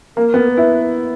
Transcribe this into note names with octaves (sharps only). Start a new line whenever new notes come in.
A#3 A#4
B3
B4
E4